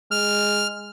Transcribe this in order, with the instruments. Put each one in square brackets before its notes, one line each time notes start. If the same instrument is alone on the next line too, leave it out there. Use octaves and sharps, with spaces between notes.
[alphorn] G#3 [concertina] F6